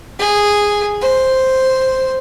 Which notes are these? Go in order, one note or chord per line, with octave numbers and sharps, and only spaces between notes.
G#4
C5